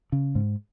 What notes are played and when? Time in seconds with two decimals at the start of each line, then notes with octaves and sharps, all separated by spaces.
0.12 C#3
0.35 G#2